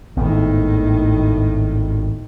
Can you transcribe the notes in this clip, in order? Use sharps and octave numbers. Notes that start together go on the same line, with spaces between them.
G#1 D2 A2 D#3 B3